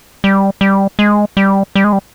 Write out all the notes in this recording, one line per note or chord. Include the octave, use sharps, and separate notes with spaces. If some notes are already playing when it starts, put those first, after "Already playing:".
G3
G3
G#3
G3
G3
G#3
G3